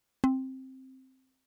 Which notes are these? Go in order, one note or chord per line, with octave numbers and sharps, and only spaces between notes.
C4